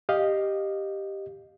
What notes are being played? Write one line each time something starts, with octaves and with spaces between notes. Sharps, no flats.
G4 D#5 F5